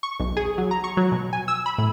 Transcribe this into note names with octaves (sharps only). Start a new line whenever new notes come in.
C#6
B1
G#4
F#3
A#5
C#6
F#3
B2
G#5
E6
B5
A2